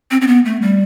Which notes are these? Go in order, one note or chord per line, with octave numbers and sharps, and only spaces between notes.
C4
C4
B3
A3
G3